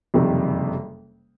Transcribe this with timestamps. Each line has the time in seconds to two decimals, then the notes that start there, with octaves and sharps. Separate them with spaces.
0.14 F#1 F2 C3 D#3 G3